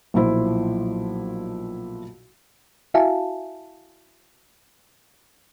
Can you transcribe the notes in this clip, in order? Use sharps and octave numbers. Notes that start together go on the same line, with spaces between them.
B1 A#2 F3 E4 C5
E4 F#4 E5 F5 G#5 A5